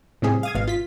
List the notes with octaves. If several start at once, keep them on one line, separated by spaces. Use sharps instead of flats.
A2 C3 G3 G#4
F5 D#6 G#6
G#1 B2 F5
F4 B6